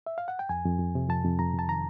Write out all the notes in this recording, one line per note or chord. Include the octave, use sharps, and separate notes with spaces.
E5
F5
F#5
G5
F2 G#5
F2
F2
C3
F2 A5
F2
F2 A#5
F2 A5
D#3 A#5